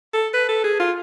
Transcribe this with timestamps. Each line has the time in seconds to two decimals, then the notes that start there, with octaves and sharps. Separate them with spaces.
0.14 A4
0.34 B4
0.49 A4
0.64 G#4
0.80 F4